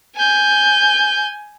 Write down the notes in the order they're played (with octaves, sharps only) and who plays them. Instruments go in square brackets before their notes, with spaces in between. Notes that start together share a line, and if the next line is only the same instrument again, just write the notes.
[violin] G#5 G6